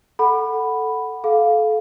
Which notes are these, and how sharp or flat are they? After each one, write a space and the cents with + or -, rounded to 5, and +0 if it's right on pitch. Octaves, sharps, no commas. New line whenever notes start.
A4 +0 F#5 +5 B5 +0
A4 -30 F5 +0